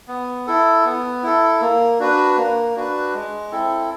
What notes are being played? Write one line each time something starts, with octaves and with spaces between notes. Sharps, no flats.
B3
E4 A4
B3
E4 A4
A#3
D4 F#4 B4
A#3
D4 F#4 B4
G#3
C4 E4 A4